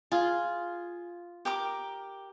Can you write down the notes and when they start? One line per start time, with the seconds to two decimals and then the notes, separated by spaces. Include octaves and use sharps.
0.12 F4 G#4
1.45 G4 A#4 D6